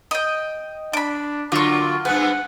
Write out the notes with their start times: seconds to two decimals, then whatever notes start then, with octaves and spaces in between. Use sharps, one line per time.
0.11 D#5 G5
0.93 D4 B5 D6
1.52 D3 F#3 A#3 F4 C#6 D6
2.05 G2 B3 B4 F#5 G#5